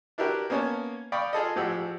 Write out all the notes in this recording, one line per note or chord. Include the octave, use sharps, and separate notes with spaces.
D4 E4 F#4 G4 A#4 B4
A#3 B3 C#4 C#5 A5
D5 F5 G5 B5 C#6 D#6
F4 G#4 A4 D#5
A1 F3 G4 G#4 F#5 E6